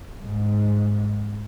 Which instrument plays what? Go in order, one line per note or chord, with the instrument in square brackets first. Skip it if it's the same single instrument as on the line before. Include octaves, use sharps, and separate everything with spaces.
[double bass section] G#2